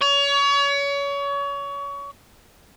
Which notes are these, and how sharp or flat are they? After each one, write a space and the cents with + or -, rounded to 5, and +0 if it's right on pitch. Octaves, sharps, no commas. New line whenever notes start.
C#5 +30